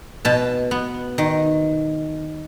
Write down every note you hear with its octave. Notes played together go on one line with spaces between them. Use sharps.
B2 A5
B3
D#3